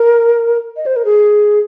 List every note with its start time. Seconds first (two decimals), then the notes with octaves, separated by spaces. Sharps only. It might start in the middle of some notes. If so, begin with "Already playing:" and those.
Already playing: A#4
0.77 D#5
0.86 C5
0.96 A#4
1.05 G#4